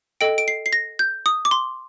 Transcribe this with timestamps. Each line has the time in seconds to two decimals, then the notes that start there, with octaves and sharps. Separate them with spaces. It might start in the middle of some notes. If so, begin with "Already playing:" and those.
0.21 A4 D#5 G5 D7
0.38 D7
0.48 C7
0.66 C7
0.73 A#6
0.99 G6
1.26 D#6
1.45 D6
1.51 C6